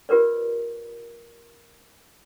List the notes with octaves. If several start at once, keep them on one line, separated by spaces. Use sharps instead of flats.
F4 G4 A#4 B4 D5